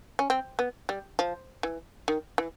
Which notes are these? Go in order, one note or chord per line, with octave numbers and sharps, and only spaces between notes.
C#4
C4
B3
G3
F3
E3
D#3
E3